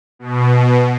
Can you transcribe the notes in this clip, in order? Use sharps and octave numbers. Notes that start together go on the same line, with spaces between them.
B2